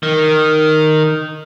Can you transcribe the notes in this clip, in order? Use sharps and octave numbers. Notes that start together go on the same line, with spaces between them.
D#3